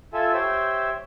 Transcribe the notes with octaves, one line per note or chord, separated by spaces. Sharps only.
F4 A4 E5 G#5
G4 C5 C#5 E5